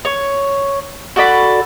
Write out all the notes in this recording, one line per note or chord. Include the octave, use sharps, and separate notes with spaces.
C#5
F#4 A4 D5 B5